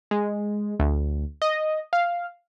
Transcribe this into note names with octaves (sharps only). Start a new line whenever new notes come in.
G#3
D2
D#5
F5